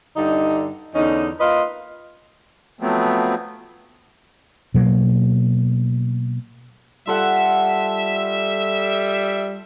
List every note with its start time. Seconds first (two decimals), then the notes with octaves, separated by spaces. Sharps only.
0.16 G2 D3 D#4
0.95 E2 D3 C#4 D#4
1.40 A#3 F4 B4 D#5
2.81 F3 F#3 A3 B3 C4
4.74 B2 F#3 A#3
7.07 G3 F4 A4 E5 F#5